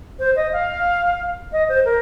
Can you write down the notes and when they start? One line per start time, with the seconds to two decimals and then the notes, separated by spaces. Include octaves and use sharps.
0.19 C5
0.36 D#5
0.53 F5
1.52 D#5
1.69 C5
1.85 A#4